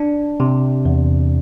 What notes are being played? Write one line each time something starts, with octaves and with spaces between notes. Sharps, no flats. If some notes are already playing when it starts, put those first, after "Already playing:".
Already playing: D4
C3
E2